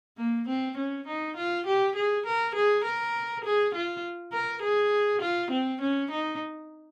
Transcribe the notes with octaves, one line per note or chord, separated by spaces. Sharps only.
A#3
C4
C#4
D#4
F4
G4
G#4
A#4
G#4
A#4
G#4
F4
A#4
G#4
F4
C4
C#4
D#4